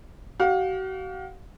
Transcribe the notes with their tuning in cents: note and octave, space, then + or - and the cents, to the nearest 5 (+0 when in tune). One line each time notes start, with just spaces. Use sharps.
F#4 +45 F5 +30